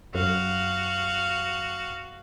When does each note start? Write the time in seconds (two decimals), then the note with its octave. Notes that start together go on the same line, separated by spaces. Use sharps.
0.15 F#2 F#4 F5